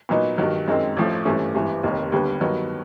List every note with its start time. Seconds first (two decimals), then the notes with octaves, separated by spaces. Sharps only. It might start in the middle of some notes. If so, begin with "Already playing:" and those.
0.09 A#2 F#3 B3 D#4
0.38 G2 D#3 F#3
0.68 F#2 D#3 G#3 C4
0.97 A1 A2 F3 A3
1.25 G#1 G2 E3 A3 C#4
1.54 G#1 G2 E3
1.83 F1 D#2 D#3
2.12 D#2 D3 G3 B3
2.41 G2 D#3 F#3 B3